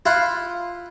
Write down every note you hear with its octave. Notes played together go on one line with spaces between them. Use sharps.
E4 F4 F#5 C6